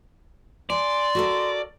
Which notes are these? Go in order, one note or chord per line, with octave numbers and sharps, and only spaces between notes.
D5 G#5 C6
F#4 A4 A#4